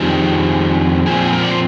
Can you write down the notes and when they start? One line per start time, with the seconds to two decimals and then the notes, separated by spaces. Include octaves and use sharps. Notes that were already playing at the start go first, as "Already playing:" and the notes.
Already playing: F2 D#3 G3 C4 G#4
1.07 A#2 F3 C4 G#4
1.25 G#4
1.33 A#4
1.43 D5
1.51 C5